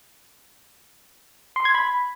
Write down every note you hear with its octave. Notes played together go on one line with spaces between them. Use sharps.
C6
G#6
B5